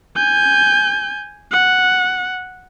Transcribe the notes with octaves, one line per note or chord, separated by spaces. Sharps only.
G#5 G6
F#5